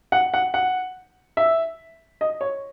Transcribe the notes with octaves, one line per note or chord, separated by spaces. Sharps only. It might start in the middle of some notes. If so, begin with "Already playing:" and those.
F#5
F#5
F#5
E5
D#5
C#5